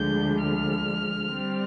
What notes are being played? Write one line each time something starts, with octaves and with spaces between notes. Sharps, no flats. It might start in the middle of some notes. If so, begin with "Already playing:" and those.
Already playing: D2 D3 F3 G#3 G6
F6
G3 C4